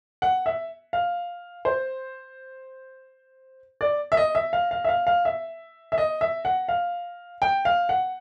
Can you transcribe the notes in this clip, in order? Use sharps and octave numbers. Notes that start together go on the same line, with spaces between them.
F#5
E5
F5
C5
D5
E5
D#5
E5
F5
F5
E5
F5
F5
E5
E5
D#5
E5
F#5
F5
G5
F5
F#5